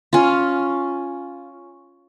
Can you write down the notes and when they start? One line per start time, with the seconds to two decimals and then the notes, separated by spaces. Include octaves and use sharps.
0.13 C#4 F4